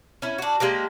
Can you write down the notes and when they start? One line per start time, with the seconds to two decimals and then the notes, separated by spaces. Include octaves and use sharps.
0.22 C#4 E4
0.39 D4 F#4
0.60 G#3 A#3 D4 G4